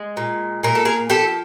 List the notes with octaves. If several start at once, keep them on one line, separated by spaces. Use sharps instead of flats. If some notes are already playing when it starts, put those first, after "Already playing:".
Already playing: G#3
A#2
A#2 A#4
A4
G#4 A#4
F3 G4 A4